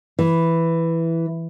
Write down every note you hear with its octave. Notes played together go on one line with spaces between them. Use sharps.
E3